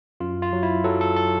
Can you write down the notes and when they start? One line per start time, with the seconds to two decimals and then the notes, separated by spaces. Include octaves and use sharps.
0.20 F#2 F4
0.42 F4
0.53 F#3
0.63 E4
0.84 F#3 A4
1.01 A4
1.16 A4